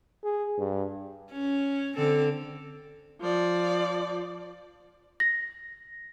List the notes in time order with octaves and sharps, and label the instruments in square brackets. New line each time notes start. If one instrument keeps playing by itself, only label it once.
[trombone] G#4
G2
[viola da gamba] C#4
D3 C4 A4
[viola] F3 D5
[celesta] A#6